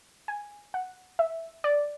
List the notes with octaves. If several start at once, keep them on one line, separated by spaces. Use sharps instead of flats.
G#5
F#5
E5
D5